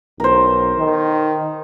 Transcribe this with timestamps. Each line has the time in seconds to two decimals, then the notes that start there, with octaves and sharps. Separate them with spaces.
0.20 B1 A#4 C5
0.78 D#3